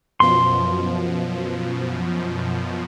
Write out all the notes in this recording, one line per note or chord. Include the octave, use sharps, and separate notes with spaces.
F#2 B2 F3 C6